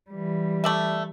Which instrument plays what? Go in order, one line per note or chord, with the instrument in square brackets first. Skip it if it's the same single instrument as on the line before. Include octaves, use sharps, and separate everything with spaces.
[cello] E3 G3
[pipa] A3 D5 E5